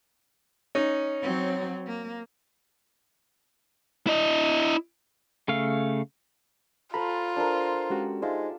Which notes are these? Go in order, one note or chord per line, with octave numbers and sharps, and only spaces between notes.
C#4 D#4
F#3 C4
A#3
E4 D#5
C#3 A3 F5
F4 A4 C5 A#5 B5
D4 A4 A#4 C5
G#3 C#4 F#4 G4 E6
G#3 D#4 F4 C5 E5 A5